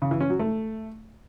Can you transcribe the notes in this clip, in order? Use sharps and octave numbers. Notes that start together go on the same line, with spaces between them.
C#3
E3
C#4
F#3
A3